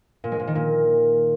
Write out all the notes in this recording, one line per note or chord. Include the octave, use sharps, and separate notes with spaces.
A#2
G#3
A#2
D#3
A#2